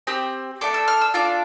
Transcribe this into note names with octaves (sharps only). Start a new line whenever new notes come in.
C4 G4 E6
A3 D4 A4 D6
E6
F6
E6
D4 F4 A4 D6